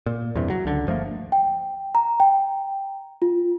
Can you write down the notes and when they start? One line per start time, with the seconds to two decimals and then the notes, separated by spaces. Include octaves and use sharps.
0.06 A#2
0.35 E2 G2 C3
0.50 F#3
0.65 C#2 D3
0.87 G1 F3 A3 A#3
1.32 G5
1.95 A#5
2.20 G5
3.22 F4